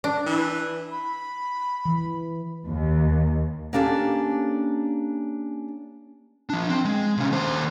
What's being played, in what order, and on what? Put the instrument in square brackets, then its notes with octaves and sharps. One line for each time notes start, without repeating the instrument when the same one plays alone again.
[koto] D4
[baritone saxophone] E3
[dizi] B5
[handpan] E3
[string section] D#2
[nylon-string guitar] A#3 C#4 D4 G4 A4
[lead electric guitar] F3 D4
C4
G#3
C3 C#4
D#2 C5